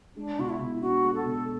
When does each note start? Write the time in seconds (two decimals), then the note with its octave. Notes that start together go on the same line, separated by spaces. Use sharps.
0.16 G#3 D4
0.38 B2 F#4
0.49 E4
0.60 B2
0.77 E4
0.81 D4 F#4
1.04 G#3
1.15 A4
1.25 B2